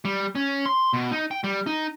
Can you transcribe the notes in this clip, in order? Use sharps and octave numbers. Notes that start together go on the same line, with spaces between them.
G3
C#4
C6
B2
D#4
G5
G3
D#4